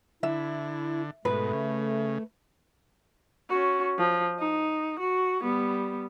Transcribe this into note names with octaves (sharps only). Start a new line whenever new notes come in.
D3 E4 E5
G#2 B2 A3 B4
C#3
C#4 F#4
F3
D#4
F#4
G3 B3